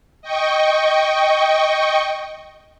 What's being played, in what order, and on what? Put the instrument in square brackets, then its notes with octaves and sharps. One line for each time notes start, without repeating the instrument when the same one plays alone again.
[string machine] D#5 G5 C#6